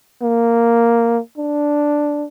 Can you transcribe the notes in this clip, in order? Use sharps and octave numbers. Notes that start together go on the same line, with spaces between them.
A#3
D4